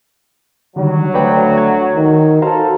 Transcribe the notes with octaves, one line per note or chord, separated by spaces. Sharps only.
D3 D#3 F#3 G3
D2 B4 D5 G5
G#6
D#3
F#4 A4 C5 F5 A#5